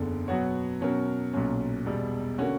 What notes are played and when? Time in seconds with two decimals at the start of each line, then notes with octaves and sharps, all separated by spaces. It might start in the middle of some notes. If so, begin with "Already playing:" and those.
Already playing: F#1 E2 D3
0.28 B2 F#3 B3 F#4 C#5
0.81 B2 F#3 C#4 F#4 A#4
1.33 B1 A#2 F#3 C#4
1.86 E1 E2 B2 G3
2.38 D3 A#3 C#4 F#4